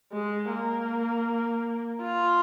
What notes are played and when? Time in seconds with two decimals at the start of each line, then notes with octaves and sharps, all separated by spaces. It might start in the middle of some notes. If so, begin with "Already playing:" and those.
0.12 G#3
0.50 A#3
2.02 F4